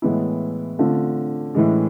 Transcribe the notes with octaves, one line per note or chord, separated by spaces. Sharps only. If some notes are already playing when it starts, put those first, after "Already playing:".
A2 E3 G#3 B3 E4
D3 A3 C4 F4
A2 E3 G#3